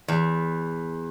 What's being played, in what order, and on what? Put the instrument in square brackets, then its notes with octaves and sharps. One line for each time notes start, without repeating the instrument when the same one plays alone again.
[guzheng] E2